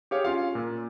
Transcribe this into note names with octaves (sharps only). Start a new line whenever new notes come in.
G4 G#4 C#5 F5
C#4 F4 F5
A#2